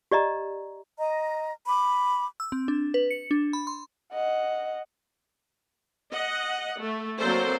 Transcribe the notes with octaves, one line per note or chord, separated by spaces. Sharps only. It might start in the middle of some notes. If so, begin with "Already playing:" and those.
G4 D5 D#5 A#5
D#5 A#5
B5 D6
E6
C4
D4
B4
C#7
D4
B5
C6
D#5 F#5
D#5 F#5
A3
F#3 A#3 C4 A4 C5 D5